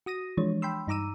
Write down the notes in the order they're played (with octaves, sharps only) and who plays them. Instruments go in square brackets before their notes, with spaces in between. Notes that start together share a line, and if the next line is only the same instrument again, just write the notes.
[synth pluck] F#4 D#6 A#6 D#7
E3 F3 G#3 D4 C#5
G5 B5 C6 E6
G2 D#4 A#5 D6 E6 D#7